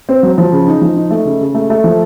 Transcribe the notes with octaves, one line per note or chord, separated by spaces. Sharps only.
C4
F#3
F3
C#3
D#4
F3
D#4
A3
C#3
C#3
A3
A3
F3